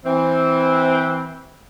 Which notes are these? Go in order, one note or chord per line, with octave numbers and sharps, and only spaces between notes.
E3 C4